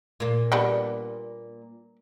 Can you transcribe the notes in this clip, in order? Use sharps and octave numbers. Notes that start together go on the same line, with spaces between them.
A#2 A#3
G3 B3 D4